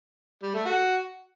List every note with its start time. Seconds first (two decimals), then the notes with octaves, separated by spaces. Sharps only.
0.43 G3
0.54 A3
0.65 F#4